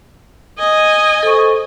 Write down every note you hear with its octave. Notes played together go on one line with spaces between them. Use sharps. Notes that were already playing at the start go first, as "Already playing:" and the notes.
D#5 G#5
A4 C5 C#6